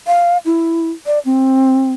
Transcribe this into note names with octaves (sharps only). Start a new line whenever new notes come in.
F5
E4
D5
C4